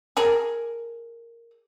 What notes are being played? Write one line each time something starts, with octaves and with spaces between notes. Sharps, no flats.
G#4 A#4